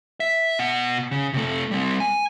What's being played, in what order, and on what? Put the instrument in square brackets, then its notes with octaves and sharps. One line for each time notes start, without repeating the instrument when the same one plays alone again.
[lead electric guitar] E5
B2 F#5
C#3
C3 A3
G3 C4
G#5